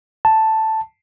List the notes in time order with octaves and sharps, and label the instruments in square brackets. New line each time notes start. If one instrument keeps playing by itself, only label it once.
[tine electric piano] A5